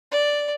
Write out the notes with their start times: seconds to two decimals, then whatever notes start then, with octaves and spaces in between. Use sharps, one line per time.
0.11 D5